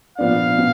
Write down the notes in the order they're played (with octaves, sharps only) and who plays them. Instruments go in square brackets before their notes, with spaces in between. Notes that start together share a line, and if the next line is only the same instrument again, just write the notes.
[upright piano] A#2 F3 B3 D4 [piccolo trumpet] F5
[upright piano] B2